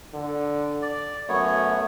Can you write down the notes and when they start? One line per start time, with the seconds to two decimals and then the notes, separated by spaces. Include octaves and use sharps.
0.14 D3
0.82 D5
1.29 F#2 A3 B3 C#5